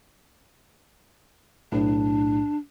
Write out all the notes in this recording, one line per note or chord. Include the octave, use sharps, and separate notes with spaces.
B1 A2 D4